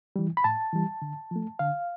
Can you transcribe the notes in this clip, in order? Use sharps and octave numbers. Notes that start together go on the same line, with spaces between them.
E3 G3
B5
A2 A5
E3 G3
D3
F3 A3
D3 F5